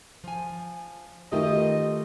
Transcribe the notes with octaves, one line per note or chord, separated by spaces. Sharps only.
F3 G#5
D#3 A3 F4 G4 D#5